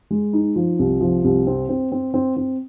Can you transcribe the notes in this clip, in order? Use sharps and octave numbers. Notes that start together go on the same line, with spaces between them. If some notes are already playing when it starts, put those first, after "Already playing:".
G#3
D#4
F3
C2
F3
C2
C4
C4
C4
C4
C4